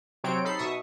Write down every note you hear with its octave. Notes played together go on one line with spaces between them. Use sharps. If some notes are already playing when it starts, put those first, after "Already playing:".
C3 F#3 C4 C#5 D7
D#4 A4 B5 C7
B2 E5 C#6 D#6